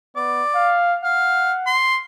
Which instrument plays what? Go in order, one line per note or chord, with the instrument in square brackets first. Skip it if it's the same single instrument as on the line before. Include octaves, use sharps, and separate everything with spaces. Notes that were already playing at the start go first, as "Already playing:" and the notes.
[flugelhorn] B3 [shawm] D5
[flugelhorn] F5
[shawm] F5 [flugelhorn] F#5
[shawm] C6